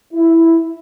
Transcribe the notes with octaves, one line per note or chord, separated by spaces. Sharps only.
E4